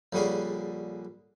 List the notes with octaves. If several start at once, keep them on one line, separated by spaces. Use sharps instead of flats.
A#1 D3 G3 C#4 G#4 F5